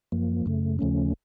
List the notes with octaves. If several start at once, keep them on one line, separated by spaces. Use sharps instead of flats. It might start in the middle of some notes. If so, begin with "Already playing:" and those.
F#2 F3 A#3
F#2 C#3 A3
D#2 C#3 F3 A3 C#4